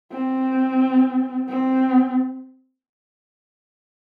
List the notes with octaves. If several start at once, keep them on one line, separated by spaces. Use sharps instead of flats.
C4
C4